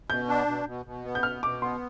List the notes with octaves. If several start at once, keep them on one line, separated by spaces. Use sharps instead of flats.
B2 G6
D4
B2
B2
B2
B3
G6
B2 F6
B2 D6
B3 C6